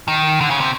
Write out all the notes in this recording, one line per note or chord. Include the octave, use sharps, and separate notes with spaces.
D#3
D3
C#3
C3